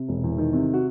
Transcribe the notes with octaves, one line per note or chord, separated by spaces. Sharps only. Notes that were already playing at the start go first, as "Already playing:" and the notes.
Already playing: C3
E1
E2
D#3
C3
F#4